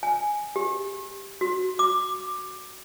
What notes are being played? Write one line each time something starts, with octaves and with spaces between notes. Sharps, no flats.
G#5
G4
F#4
D6